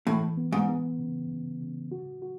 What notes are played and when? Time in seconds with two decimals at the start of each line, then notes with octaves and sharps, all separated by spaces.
0.07 A2 E3
0.37 B3
0.52 G#2
0.68 B3
0.99 C#3
1.30 C#3
1.61 C#3
1.91 F#4
2.22 F#4